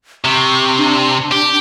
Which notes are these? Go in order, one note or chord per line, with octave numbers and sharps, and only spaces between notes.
C3 C#6
D4
G4